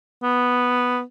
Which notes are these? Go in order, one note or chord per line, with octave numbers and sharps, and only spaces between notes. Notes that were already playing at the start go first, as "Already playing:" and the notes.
B3